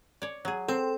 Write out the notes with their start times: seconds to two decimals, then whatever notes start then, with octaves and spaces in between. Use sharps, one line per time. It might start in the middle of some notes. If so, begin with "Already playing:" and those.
0.22 C#5 D5
0.45 F#3 G#4
0.68 C4 A4 G5 C6